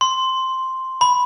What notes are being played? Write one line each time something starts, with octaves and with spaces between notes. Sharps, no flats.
C6
B5